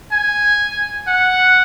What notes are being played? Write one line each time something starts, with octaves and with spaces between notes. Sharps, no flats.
G#5
F#5